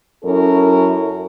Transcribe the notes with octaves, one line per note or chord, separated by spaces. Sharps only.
F#2 C#4 E4 A4 A#4